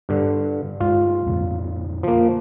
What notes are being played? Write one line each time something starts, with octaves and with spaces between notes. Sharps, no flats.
G2 D3
G2 G#3 F4
F2 B2 D3
F3 A#3